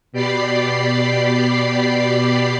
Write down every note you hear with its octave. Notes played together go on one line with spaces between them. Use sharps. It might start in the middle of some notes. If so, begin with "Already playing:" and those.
B2 G4 D5 B5 C7